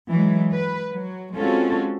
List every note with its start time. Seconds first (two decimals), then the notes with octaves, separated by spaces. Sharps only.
0.10 E3 F#3 G#3
0.54 B4
0.92 F#3
1.35 G#3 C4 C#4 F4 F#4 A4